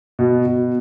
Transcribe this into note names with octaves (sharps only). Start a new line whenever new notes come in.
B2
B2